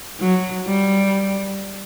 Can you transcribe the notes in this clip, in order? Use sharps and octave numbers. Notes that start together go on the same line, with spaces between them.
F#3
G3